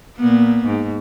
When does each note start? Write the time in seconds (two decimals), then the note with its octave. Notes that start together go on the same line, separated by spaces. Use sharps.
0.17 A#2 A#3 B3
0.65 G#2